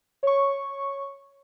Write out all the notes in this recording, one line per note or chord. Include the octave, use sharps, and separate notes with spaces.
C#5 C#6